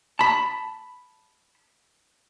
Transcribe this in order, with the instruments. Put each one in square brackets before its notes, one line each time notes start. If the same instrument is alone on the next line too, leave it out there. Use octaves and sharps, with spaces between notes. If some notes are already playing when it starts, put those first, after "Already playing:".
[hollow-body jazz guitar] A5 B5